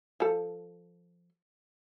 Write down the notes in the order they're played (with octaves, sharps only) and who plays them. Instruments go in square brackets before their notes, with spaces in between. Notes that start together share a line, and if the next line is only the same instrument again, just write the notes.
[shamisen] F3 A4